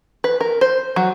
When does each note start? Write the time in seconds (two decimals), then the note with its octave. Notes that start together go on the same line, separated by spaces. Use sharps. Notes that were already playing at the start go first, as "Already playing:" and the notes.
0.24 B4
0.40 A#4
0.61 C5
0.96 F#3